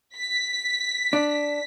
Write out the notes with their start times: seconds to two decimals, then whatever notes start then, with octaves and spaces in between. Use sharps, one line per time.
0.16 B6
1.13 D4